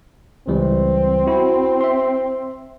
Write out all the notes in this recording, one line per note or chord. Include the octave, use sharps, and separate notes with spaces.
C#2 E3 G3 C4
E4 F#4
E5 C6